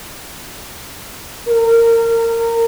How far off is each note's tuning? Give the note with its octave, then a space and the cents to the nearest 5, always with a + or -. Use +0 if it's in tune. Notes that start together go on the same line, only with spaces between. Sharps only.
A#4 -20